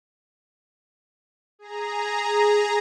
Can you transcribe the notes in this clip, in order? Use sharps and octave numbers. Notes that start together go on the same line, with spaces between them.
G#4 A#5